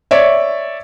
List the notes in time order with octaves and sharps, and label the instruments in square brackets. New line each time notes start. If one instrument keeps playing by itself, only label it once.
[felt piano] C#5 D5 E5